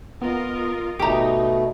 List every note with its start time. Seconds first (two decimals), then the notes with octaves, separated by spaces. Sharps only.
0.22 B3 F4 A#4 D#5
0.99 G#1 B2 A3 D#4 G4 A#5